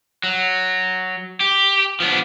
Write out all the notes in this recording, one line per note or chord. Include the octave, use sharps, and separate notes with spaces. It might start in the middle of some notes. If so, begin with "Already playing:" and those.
F#3
G4
F3 B3 D4